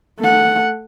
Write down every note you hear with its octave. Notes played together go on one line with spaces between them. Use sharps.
A3 F#5